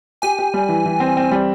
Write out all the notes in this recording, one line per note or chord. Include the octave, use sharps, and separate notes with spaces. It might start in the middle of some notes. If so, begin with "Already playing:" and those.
G4 G#5
G4
G3
E3
E3
C4
C4
G3